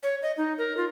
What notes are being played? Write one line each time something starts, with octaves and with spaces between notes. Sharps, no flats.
C#5
D#5
D#4
A#4
F4